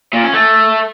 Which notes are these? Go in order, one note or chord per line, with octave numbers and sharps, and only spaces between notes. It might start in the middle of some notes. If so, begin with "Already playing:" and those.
A#2
C#4
A3